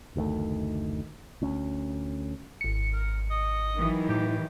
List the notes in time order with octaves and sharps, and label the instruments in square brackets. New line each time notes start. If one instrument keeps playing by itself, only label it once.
[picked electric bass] F#1 D2 D#3 A3
D2 C#4
[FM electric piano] G#1 C#7
[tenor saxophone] A#4
D#5
[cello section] D#3 E3 F#3
[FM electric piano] A2 [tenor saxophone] G4